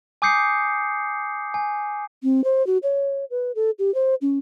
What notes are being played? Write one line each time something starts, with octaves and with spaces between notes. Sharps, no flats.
G#5 D6 D#6 G6 C7 C#7
G#5
C4
C5
F#4
C#5
B4
A4
G4
C5
C#4